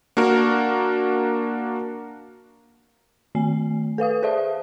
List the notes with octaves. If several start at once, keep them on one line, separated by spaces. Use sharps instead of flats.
A#3 D4 F#4 A#4
D#3 A3 G#5 C7
A4 B4 F5 D#6
G#4 C5 D5 E5 A5 D#6